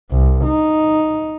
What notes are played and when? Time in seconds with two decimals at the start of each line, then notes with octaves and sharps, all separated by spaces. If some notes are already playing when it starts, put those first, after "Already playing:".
0.11 C2
0.45 D#4